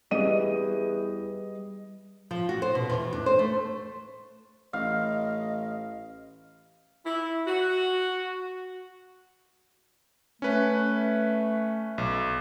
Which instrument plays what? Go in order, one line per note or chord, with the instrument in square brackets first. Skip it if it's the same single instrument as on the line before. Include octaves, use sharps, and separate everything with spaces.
[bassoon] E2 [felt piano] G3 D#5 D#7
[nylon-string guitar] F3
F#4
C5
B2
E2
D4
C5
A3
[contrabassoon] A1 [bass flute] D#5 [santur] F5
[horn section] E4
F#4
[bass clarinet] A3 [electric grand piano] C#4 B4
[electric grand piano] B1